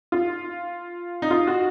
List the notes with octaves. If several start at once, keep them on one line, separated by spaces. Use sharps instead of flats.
F4
D#4
F4
F#4